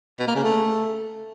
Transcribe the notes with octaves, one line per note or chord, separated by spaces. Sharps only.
B2
A#3
C#3
A3